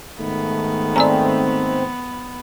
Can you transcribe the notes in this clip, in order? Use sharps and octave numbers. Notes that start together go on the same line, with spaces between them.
G#2 D#3 A3 B3
C4 D5 G#5 A#5